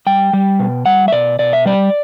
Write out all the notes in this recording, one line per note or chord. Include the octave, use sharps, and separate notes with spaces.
G3 G5
G3
B2
G3 F#5
E5
B2 D5
B2 D5
E5
G3 D5